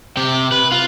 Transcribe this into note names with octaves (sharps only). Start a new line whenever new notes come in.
C3 G4
B4
F4